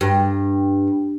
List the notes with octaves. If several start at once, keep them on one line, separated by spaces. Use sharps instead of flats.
G2